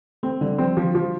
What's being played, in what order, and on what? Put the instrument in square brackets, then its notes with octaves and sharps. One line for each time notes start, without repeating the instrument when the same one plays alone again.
[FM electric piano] A3 [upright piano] C4
[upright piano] D3 [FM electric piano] G3
[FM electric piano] F3 [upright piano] C4
[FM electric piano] D3 [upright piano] F3
[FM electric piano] D3 [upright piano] F3